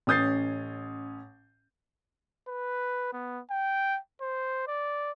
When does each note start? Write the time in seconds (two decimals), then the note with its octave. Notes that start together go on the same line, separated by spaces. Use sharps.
0.07 A1 C#4 D#6 G6 A6 C7
2.48 B4
3.13 B3
3.51 G5
4.21 C5
4.68 D5